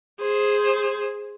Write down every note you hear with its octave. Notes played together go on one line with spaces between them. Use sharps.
G#4 C5